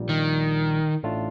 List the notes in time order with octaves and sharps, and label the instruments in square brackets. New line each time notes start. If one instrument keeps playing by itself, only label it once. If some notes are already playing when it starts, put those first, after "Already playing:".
Already playing: [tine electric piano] A#1 A#2 G3
[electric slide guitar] D#3
[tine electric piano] A1 A2 A3 D4 F4